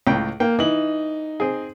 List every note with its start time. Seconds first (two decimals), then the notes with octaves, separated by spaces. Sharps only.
0.07 C#2 A2 G5
0.40 A#3 G5
0.59 E3 D#4 F#7
1.40 C4 G#4